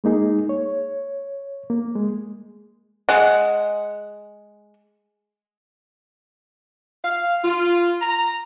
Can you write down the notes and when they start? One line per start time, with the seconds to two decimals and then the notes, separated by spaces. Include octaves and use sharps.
0.04 G#3 A#3 D#4 G#4
0.49 C#5
1.70 A#3
1.96 G#3
3.09 G#3 F#5
7.04 F5
7.44 F4
8.01 A#5